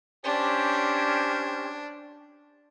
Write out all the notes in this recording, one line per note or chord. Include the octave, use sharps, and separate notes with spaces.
C#4 D4 G4 C5